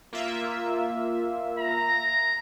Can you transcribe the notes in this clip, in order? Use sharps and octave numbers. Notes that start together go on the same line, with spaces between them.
A#3 F4 E5
A#5